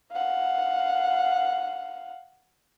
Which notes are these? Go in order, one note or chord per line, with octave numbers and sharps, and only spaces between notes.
F5 F#5